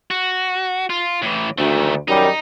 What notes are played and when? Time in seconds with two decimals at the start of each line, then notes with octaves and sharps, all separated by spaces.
0.11 F#4
0.90 F4
1.22 A2 E3
1.58 D2 D#3 A3
2.08 F#2 D#3 G3 D#4